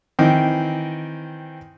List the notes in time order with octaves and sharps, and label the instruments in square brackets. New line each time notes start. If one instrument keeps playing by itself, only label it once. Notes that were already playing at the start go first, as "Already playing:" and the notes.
[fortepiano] D#3 E3 C4